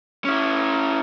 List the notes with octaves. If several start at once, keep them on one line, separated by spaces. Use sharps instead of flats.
C#4 E4